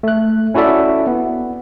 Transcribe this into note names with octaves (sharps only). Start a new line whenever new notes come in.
A3 F#6
C#4 E4 F#4 A4 D5 E5
B3